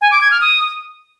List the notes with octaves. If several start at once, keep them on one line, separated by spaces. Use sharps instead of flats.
G#5
D6
G#6
F6
D#6